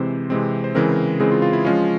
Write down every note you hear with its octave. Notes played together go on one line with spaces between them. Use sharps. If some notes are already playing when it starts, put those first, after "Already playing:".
Already playing: C3 E3 G#3 C4 C5
C3 E3 G#3 C4
C5
C#3 E3 G#3 C4 A#4
C#3 E3 G#3 C4 G#4
F4
F4
E4
F3 G#3 C#4 F4